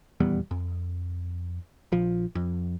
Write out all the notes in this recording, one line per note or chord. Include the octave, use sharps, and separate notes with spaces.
D#1 E2 G3 B3
F2
A#1 F3
F2